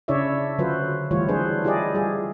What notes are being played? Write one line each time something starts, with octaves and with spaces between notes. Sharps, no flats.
C#3 D4 E4 C#5 D5 E5
D3 F#3 F4 F#4 B4 C5
E3 G3 A3 E4 F4 C#5
F#3 D4 G#4 B4 C5
E4 F4 G4 G#4 D5 D#5
G3 F4 G#4